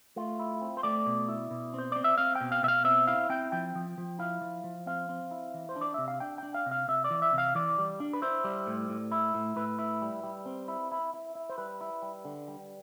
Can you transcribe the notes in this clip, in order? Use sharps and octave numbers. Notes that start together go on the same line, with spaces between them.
A3 F4
E4
C4
C5
A3 D5
B2
E4
B2
C4 C5
C4 D5
E5
C4 F5
G5
B2
F5
B2 E5
F5
C4 E5
E4 F5
C4 G5
F3 G5
F3
F3
E4 F5
F3
F3
C4 F5
C4
E4
E3
C5
D4
D5
C3 E5
F5
D4 G5
D4 G5
F5
C3
F5
C3 E5
D5
E3
E5
C3
F5
E3 D5
G3
D4
B4
E4 C5
G3
A2
A2
E4
A2
A2 B4
E4
G3
G3
C4
E4
E4
E4
E4
C5
G3 B4
E4
G3
D3
G3